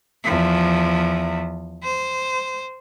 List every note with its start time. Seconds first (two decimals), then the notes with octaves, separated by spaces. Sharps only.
0.24 E2 F3
1.83 C5